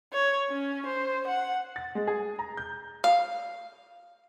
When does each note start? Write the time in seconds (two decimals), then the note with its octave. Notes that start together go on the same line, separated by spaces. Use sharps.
0.13 C#5
0.50 C#4
0.86 C5
1.27 F#5
1.76 A6
1.95 G#3
2.07 G#4
2.39 A#5
2.57 G6
3.04 F5